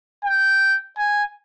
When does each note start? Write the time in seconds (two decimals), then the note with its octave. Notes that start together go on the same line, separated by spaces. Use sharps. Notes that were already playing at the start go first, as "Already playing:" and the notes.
0.24 G5
0.98 G#5